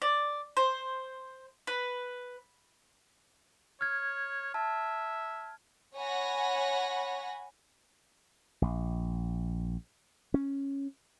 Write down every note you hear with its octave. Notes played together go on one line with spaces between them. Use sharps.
D5
C5
B4
C#5 F6 G#6
E5 A5
C#5 F#5 G#5 B5 A#6
A#1
C#4